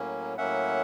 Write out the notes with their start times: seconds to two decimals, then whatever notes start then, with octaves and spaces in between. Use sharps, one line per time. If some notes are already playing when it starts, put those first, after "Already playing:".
Already playing: A2 F#3 A#3 C#4
0.38 A2 F#3 A#3 C#4 E5 F#5